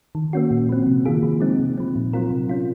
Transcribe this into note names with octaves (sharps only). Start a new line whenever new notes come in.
D#3
A#3 C#4 F#4
A#2
F3 C4
C3
D#3 A#3 F4 G#4
F3
G#3 C4 D#4
C3
F3 C4
A#2
F#3 C4 F4 A#4
C3
F#3 C#4 F4